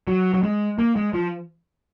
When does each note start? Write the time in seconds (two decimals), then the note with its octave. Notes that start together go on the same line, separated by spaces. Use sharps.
0.07 F#3
0.34 F#3
0.43 G#3
0.78 A#3
0.96 G#3
1.14 F3